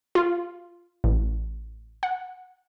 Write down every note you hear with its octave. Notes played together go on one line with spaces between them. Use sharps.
F4
A1
F#5